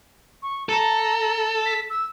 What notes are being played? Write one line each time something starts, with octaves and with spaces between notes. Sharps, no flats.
C#6
A4 A#5
B6
E6